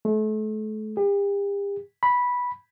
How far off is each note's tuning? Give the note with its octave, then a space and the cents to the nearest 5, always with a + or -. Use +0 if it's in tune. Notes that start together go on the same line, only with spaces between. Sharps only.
A3 -35
G4 +40
B5 -10